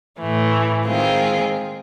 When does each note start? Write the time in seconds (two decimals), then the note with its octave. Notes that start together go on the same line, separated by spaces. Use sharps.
0.19 A2 E3 A3
0.86 D#3 G#3 C4 F4 G#4